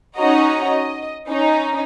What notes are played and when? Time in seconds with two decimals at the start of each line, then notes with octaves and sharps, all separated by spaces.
0.19 C#4 D#4 F#4 C#5 D#5 A#5
0.68 D#5
1.29 C#4 D#4